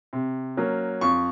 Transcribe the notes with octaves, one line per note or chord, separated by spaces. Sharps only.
C3
F#3 A#3 C#4
F2 C#6